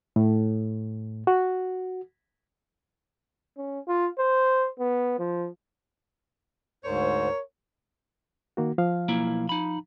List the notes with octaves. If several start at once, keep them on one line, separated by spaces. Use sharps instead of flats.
A2
F#4
C#4
F4
C5
B3
F3
D2 G#2 A#4 C5 C#5
D#3 A#3 F#4
F3 F5
B1 A#3 E4
D#4 B5